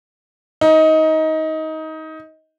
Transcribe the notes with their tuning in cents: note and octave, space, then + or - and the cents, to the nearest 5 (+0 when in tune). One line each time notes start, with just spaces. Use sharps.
D#4 +20